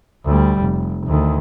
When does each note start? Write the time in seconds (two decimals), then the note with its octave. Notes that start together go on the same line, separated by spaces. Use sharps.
0.25 D2 G3
0.60 F1
1.07 D2 D#3